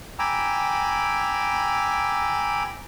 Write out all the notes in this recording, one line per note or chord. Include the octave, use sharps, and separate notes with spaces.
G5 G#5 A#5 B5 D6 E6